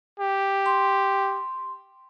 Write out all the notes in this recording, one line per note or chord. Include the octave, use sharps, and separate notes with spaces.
G4
C6